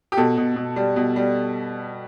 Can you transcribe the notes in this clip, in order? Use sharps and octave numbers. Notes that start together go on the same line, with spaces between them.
G4
B2 A4
B2
B2
G3
B2
G3